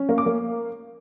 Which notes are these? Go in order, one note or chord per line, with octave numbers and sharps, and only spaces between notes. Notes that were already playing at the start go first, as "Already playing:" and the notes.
Already playing: C#4
A#3
D6
A#3